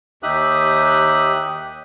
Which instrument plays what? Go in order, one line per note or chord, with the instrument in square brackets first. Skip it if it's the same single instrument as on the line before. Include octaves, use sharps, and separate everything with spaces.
[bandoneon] D#2 D#4 G4 E5 D#6 F#6